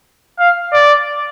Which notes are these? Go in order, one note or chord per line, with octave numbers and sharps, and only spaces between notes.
F5
D5